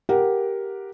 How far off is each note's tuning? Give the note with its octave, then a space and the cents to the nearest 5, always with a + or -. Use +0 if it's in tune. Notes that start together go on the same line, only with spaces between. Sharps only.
G4 +0 A#4 +5 F#5 +0